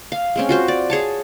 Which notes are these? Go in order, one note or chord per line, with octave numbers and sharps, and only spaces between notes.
F5
G#3 C4 C#4
F4 F#4 C5
D5
G#4 C#5 A5